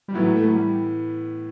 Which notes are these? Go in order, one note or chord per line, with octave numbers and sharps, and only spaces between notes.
G3
A2 E3 F#3 B3
A3
F#3
G3